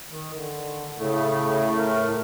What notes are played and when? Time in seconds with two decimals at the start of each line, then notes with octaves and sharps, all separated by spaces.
0.07 D#3
0.34 D3
0.98 A2 C#3 A3
1.77 A#4